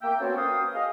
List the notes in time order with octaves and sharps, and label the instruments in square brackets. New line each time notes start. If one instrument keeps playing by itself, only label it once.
[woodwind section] A#3 E5 G5
B3 C#4 F#4 A4 C5 C#5
A#3 B4 F5 G5 D#6
G#4 D#5 F5